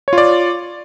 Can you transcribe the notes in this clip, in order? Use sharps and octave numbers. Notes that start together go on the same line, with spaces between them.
F4 C#5 D5